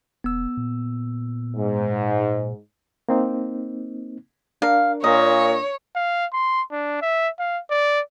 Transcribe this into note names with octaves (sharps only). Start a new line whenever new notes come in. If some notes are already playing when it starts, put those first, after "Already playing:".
E1 B3 E6
A#2
G#2
A#3 C4 D#4
D4 A#4 F5
A#2 C#5 D#5
F5
C6
D4
E5
F5
D5